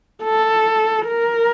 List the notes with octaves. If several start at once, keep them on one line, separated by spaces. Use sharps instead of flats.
A4
A#4